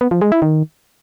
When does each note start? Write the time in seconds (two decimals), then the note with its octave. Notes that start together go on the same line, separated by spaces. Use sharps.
0.01 B3
0.11 F3
0.21 G#3
0.32 E4
0.42 D#3